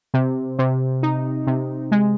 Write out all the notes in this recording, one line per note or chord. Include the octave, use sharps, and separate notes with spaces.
C3
C3
D#4
C3
G#3